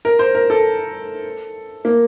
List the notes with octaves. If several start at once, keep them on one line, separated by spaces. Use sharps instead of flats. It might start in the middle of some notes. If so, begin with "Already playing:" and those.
A#4
C5
A#4
A4
A#3